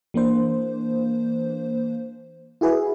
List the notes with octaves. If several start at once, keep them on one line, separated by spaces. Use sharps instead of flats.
E3 A#3 D4 C5
E4 F#4 G#4 B4 E5